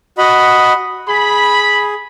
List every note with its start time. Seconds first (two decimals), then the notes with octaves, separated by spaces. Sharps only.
0.18 F#4 D#5 B5
1.08 G#4 B5